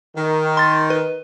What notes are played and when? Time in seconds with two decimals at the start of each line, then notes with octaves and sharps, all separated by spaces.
0.16 D#3
0.57 C6 A6
0.90 B4